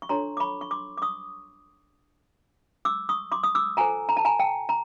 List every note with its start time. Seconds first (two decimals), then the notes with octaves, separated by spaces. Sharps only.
0.02 C#6
0.09 D4 F4 A4 C#5 A#5 C6
0.37 D6
0.40 B5 C#6
0.61 C#6
0.71 C6 D6
0.98 D6
1.02 C#6 D#6
2.85 D6 E6
3.09 C#6 D#6
3.32 C6 D6
3.43 D#6
3.55 D6 E6
3.77 F4 A4 C5 G#5 A#5
4.09 A#5
4.17 A5
4.25 G#5 A#5
4.39 G5 A5
4.69 A#5